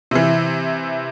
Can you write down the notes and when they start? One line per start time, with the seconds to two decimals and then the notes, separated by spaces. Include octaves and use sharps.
0.11 C3 E3